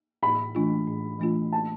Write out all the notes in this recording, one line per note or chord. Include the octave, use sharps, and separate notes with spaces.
A2 B5
E3 A3 D4 F4
A2
E3 A3 D4 F4
A5